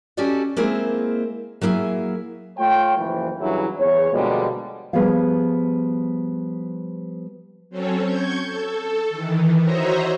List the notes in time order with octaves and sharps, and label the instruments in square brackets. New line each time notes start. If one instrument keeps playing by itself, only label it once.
[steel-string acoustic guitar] C#4 F#4 G4 A4 D5 D#5
G#3 A#3 C4 E4 G#4
F#3 A#3 E4 G#4
[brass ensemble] A3 F4 C#5 G5
F#1 A#2 E3 F3
G2 C#3 E3 F#3 E4
E2 C#5
B2 D3 F3 G3 G#3 A#3
[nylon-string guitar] F3 G3 B3 G#4 C#5 F5
[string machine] F#3 C4 C#4 A4 C#5
C#6 G6 G#6
A4
D#3 E3
F#4 C5 C#5 D#5 E5 A#5